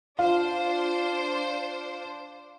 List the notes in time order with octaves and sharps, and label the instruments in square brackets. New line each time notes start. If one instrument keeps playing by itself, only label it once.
[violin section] D4 C5 [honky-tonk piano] F4